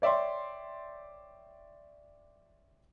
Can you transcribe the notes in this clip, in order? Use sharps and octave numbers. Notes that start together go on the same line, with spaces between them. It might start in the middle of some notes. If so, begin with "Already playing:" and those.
C#5 D5 E5 G5 C6